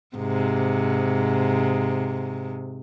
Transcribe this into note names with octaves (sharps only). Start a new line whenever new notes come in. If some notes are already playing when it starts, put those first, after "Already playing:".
G#2 C3